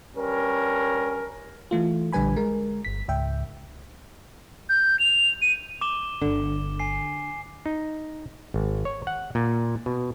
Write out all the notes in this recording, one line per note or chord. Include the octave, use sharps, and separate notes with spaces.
G2 C#4 A#4
E3 A3 F4
A#1 D3 G3 B4 G#5 B5
G#3 A#4
G1 B6
C#2 G#2 E5 G5
G6
F7
D#7
D6 E7 G7
G1 D3
G#5 C7
D#4
G#1
C#5
F#5
A#2
B2